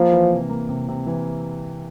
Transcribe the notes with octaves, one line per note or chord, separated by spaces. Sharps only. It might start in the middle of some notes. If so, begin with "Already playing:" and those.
Already playing: F3 A#3
E3
C3
A#3
C3
C3
E3